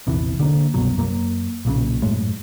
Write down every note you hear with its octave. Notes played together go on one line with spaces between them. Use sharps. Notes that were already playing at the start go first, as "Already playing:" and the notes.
A#1 E2 C3 E3
D3 A#3
C2 F#2 B2 F#3
F#2 A#3
B1 A#2 C#3
F#2 A2 G#3